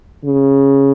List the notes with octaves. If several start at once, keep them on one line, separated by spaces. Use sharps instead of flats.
C#3